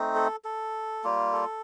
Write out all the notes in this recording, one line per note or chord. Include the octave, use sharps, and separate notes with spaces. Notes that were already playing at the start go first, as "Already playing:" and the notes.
Already playing: A3 C4 D#4
A4
A4
G3 A#3 F4
A4